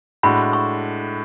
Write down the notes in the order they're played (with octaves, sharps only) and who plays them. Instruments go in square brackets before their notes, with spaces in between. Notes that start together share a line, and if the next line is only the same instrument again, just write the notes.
[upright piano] A2 G#3 D4 F#4 [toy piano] B5
[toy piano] C#6